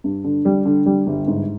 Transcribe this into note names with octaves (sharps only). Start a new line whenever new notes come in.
G2
D3
G3
D3
G3
G1
G#2